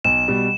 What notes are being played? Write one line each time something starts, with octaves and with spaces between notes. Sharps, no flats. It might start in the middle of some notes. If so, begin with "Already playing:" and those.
B1 E7
B2 G3